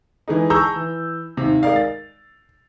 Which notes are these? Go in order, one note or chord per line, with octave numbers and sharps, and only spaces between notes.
D3 E3 G#3 D#4
G#4 A5 A#5 C#6 E6 G6
E3
D#2 G#2 C3
G#3 D#4 A#4 D5 F5
A6